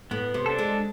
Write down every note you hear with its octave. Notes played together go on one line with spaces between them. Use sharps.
A2 B3
C3
D4 A4
G#3